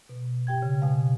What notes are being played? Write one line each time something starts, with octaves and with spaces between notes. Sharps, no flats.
B2
G2 G4 G5 G#6
C#3
B2 G#3 F5